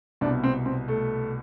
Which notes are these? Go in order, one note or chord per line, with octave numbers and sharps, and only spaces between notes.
C2 B2 D4
C4
C4
A3